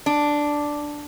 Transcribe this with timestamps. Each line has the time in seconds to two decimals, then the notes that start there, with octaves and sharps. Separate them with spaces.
0.06 D4